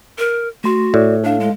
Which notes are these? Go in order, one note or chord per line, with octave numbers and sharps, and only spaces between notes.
A#4
A3 F#4 C6
A2 D5
D4 A4 F5
G#3